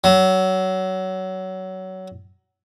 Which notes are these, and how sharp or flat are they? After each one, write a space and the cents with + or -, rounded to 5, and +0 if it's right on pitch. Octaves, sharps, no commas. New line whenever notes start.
F#3 +20